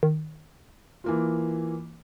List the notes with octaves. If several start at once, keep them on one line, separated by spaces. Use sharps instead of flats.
D#3
E3 A#3 F4